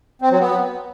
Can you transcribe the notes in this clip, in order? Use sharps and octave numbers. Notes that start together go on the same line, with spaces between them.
C4
F#3
B3